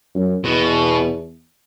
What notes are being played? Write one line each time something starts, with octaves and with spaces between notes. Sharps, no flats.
F#2
E2 B2